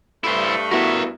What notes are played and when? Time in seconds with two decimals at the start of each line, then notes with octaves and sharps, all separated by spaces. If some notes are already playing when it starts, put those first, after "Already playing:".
0.24 G2 A3 E4 C5
0.72 B3 E4 F#4 A#4 E5